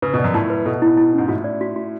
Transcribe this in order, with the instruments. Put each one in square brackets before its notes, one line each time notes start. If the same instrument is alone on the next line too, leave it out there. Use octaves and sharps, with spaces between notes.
[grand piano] C#3 [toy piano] B4
[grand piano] B2 [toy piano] D5
[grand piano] F#2
[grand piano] A2 [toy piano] A5
[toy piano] B4
[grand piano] B2 [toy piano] A4
[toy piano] E4
E4
[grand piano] G#2 [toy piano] C#4
[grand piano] A2 [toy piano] F#4
[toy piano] D5
F#4
F#4